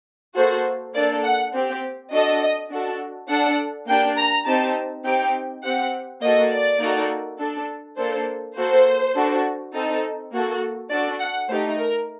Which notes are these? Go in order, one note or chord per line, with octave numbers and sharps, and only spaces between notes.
A#3 F#4 A4 C5
A#3 D4 A4 D5
F#5
C4 G4
D4 F#4 A4 D#5
D4 F#4 A4
D4 A4 F#5
A#3 D4 G4 G5
A#5
C4 D#4 G4 A5
C4 D#4 G4 G5
C4 G4 F#5
A#3 F#4 A4 D#5
D5
A#3 D#4 F#4 A4
D4 A4
A#3 D4 A4 C5
A#3 F#4 A4 C5
D4 F#4 A4
C4 D#4 A4
A#3 F#4 A4
D4 F#4 A4 D5
F#5
A3 D#4 G4 C5
A#4